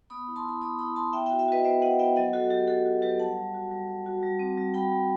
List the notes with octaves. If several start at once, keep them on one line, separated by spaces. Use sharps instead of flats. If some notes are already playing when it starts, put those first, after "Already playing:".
B3 B5 D#6
E4
A5 C6
E4 B5 D#6
B3 B5 D#6
E4 B5 D#6
E4 A5 C6
B3 E5 G5
E5 G5
F#4
E5 G5
F#4 B4 D#5
B3 C5 E5
B3 D#5 F#5
B3 E5 G5
F#3 D#5 F#5
F#3 F#4 A4
F#3 G4
F#3 F#4 A4
F#4
F#3 G4 B4
G3 F#5 A5
G3
F#4
G3
G3
F#4
G3
C4
G3
G3 G5 B5
G3